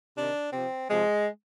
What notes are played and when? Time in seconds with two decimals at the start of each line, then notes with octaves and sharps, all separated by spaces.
0.16 C3 D#3 D4
0.53 C3 F3 C4
0.89 C3 F3 G#3